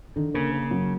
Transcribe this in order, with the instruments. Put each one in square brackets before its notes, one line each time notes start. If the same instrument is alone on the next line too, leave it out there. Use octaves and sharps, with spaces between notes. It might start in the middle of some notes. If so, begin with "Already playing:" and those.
[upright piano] D3 [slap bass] D#3
[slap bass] C#3 [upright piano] A#3
[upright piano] A#3
F#3